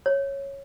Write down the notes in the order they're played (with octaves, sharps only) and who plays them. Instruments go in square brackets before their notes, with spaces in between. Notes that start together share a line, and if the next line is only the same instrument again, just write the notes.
[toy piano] C#5